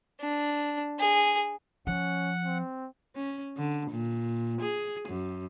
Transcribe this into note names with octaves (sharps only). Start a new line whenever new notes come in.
D4
G#4
F3 C#4 F#5
C4
C#4
D3
A#2
G#4
F#2